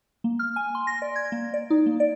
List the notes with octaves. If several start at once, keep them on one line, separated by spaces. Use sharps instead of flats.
A#3
F6
G#5
C6
A#6
D5
G#6
A#3
D5
D#4
A#3
D5